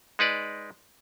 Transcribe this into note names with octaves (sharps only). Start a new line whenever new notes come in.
G#3 D#4 B4 D5